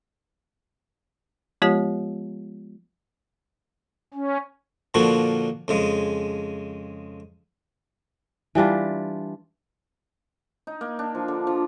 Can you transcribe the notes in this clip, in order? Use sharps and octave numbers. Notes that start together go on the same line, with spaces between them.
F3 G#3 B3 F4 G4 C#5
C#4
A#2 D3 F3 F#4
F2 C#3 G#3
E3 G3 D4 F4
D#4
A#3
D4
F3
D3
F3